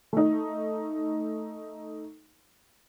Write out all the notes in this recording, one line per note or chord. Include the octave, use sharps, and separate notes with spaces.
A3 D#4